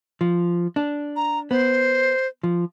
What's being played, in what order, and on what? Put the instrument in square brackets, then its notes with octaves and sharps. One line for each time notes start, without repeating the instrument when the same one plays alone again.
[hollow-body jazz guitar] F3
D4
[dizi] A#5
[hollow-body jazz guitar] B3 [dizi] C5
[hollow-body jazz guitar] F3